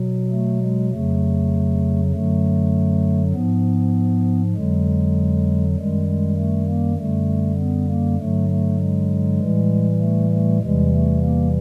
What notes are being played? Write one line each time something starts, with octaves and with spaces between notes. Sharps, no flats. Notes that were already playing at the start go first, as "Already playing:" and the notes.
Already playing: B2 F#3
A3
G#3
F2 C#3 F#3 A3
F#2 D3 F#3 A3
G#2 F3 B3
F2 D3 F#3 G#3
F#2 D#3 G3 G#3
G#3
A3
A#3
F#2 D3 G3 A3
B3
A#3
G2 D3 F#3 A3
A3
G#3
A2 E3 G3
A3
A3
E2 C3 E3 G3 G#3
A3
A#3